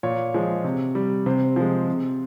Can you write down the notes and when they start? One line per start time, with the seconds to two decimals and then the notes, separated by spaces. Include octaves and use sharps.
0.03 A#2 C#5
0.34 F3 G#3
0.64 C3
0.95 G3
1.26 C3 C5
1.56 F3 G#3
1.88 C3